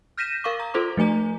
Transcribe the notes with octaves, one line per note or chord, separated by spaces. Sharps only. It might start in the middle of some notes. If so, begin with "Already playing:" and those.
F6 G6 A#6 B6 D#7 E7
A#4 F5 C#6 D6
A#5
F4 A4 C5 C6 D6
F3 A3 G#5 A#5